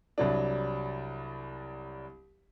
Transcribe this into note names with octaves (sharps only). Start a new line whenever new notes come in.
C2 F#3 D4